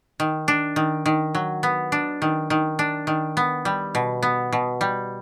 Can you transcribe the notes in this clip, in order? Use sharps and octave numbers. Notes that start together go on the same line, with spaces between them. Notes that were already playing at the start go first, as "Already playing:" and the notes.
D#3
D4
D#3
D#3
F#3
B3
D4
D#3
D#3
D4
D#3
B3
G3
B2
B3
B2
G3